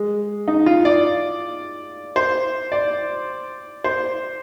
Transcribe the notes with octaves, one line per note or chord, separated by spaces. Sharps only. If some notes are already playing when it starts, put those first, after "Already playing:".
Already playing: G#3
D#4
F4
D5
C5
D5
C5